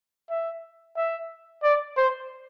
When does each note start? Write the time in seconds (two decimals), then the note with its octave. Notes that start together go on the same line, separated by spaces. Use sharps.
0.30 E5
0.96 E5
1.63 D5
1.97 C5